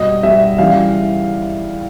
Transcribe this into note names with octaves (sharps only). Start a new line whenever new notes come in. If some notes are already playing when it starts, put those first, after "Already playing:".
Already playing: B2 G3 D#5
B2 G3 E5
C#3 E3 G3 F5